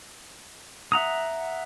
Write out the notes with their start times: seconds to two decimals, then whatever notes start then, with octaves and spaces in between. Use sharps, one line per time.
0.92 E5 F#5 A#5 D#6